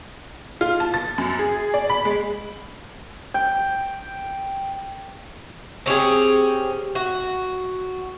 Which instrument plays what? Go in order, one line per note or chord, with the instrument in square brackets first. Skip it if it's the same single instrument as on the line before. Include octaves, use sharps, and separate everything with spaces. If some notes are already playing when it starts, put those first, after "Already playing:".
[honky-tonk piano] F4
A5
A6
F#2
G#4
D5
B5
G#3
[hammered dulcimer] G5
[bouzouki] C4 C#4 G4 G#4
F#4